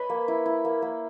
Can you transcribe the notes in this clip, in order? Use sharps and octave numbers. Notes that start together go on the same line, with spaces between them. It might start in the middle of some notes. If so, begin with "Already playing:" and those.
Already playing: B4 C#5 D#5
A#3
E4
E4
A#3
A#3